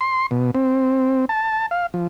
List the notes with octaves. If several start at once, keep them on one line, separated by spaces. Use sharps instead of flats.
C6
B2
C4
A5
F5
F3